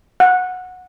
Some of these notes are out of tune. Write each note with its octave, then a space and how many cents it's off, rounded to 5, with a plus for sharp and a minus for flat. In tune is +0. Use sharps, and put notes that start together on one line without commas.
F#5 -15